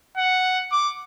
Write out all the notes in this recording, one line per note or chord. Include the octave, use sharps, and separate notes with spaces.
F#5
D6